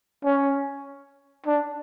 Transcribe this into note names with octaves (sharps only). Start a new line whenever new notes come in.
C#4
D4